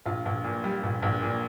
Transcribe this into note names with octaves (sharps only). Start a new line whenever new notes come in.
A#1 F4
A#1
A#2
G3
A#1
A#1
A#2